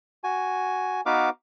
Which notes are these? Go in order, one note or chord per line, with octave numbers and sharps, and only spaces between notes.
F#4 G#5
B3 D#4 F#4 B4 F5 D6